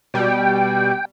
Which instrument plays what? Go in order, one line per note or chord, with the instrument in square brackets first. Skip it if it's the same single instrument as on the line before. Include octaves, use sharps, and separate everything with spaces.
[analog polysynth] B2 G3 [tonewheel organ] G5